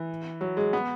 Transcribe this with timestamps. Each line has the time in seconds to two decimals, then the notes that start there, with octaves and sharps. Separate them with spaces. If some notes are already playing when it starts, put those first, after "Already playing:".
Already playing: E3
0.41 F#3
0.57 G#3
0.73 B3